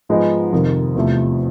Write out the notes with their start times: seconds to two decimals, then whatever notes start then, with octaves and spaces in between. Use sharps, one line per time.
0.09 G#2 F3 G#3 B3 D#4
0.52 F2 C3 D#3
0.95 E2 C3 F3 A3